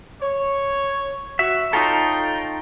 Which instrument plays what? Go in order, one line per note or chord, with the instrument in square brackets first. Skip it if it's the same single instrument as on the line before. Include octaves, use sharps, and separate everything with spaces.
[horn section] C#5
[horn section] F#4 [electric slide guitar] E5
[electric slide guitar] D#4 F4 A4 [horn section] C#5 G5 A#5